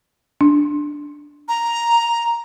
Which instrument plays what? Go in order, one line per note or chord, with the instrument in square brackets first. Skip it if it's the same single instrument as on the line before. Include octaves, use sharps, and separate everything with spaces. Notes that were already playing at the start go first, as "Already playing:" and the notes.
[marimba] D4
[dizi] A#5